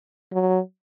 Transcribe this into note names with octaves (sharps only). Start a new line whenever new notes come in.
F#3